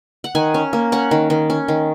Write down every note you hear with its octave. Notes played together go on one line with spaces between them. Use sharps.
F#5
D#3 G#5
C#4
A#3
C#4 F#5
D#3
D#3
C#4
D#3